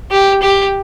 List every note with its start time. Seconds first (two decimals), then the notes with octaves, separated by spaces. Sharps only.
0.11 G4
0.42 G4